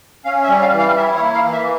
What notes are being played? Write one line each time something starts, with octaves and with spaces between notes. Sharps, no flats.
C#4 F5
E5
G3
F5
E3
F5
E4 E5
C#5
A#3
F5
E3
E5